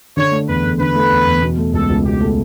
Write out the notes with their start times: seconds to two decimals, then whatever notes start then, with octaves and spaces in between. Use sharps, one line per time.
0.16 D3 C#5
0.32 A3
0.47 E2 B4
0.64 E2
0.79 D3 B4
0.95 A3
1.11 E2
1.26 E2
1.42 B2
1.58 A3
1.73 C#2 A4
1.89 C#2
2.05 B2 G4
2.20 A3